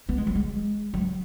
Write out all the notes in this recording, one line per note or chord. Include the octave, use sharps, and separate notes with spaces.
B3
G#3
F#3
G#3
F#3